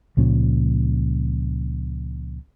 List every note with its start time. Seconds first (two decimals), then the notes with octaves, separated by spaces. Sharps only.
0.17 C#2 A#2 F3 C#4